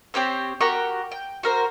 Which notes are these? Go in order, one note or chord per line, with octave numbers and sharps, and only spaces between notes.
C4 G4 C5 C#5
F#4 G4 A#4 C#6
G5
F#4 A#4 C5